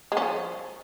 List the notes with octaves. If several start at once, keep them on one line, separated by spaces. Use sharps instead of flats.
G#3
C#4
F3